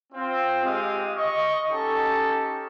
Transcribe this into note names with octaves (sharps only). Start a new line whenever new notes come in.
C4 F4
G#3 G4 F5 D#6
D#5 C#6
C#4 D#4 G4 A4